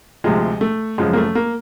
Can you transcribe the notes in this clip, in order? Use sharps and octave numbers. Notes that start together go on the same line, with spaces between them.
D2 C3 F3 G#3
A3
F#2 C#3 F3 G#3
A#3
A3
A#3